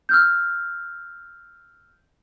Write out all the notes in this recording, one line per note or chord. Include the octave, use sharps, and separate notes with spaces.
E6 F6 G6